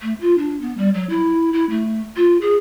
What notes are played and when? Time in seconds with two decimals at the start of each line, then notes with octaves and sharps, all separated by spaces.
0.01 A3
0.21 F4
0.38 D4
0.61 B3
0.78 G3
0.94 F#3
1.10 E4
1.53 E4
1.70 A3
2.16 F4
2.41 G#4